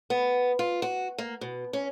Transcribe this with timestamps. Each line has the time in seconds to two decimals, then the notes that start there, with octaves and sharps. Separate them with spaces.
0.10 B3
0.59 F4
0.82 F#4
1.18 A#3
1.41 B2
1.73 C#4